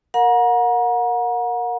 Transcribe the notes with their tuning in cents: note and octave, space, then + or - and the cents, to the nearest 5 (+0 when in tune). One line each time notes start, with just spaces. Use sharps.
A#4 +0 F#5 -40 A#5 +35